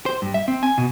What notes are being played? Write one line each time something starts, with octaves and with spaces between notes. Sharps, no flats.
C5
G2
E5
C4
G#5
B2